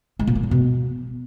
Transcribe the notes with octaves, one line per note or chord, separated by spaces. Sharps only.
G#3
A#2
A#3
F#3
B2